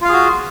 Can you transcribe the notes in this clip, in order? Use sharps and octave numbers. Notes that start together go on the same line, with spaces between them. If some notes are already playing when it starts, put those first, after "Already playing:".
F4 F#4 G#4 F5